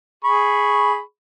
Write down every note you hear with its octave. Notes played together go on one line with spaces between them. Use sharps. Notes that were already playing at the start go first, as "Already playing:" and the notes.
G#4 B5 C#6